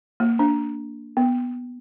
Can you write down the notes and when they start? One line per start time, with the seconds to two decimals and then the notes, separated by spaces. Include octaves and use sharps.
0.20 A#3
0.39 D4
1.17 B3